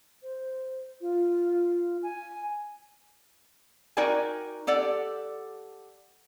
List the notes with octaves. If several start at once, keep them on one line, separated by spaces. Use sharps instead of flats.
C5
F4
G#5
D#4 F#4 A#4 D5 G5 G#5
G4 A4 D5 F#5